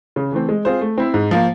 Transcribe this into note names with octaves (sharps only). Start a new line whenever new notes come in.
C#3
E3 A3 C4
G#3
C4 F4 G#4 C5
A3
C4 E4
G#2
F3 A#3